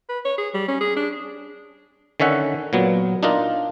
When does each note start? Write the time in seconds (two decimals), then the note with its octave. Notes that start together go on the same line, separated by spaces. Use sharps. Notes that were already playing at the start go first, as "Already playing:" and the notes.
0.08 B4
0.25 C#5
0.38 G#4
0.54 G3
0.68 C#4
0.80 G#4
0.96 D4
2.20 D3 D#3 C#4 E5 F#5
2.73 A#2 F#3 B3
3.23 D4 D#4 F4 A#4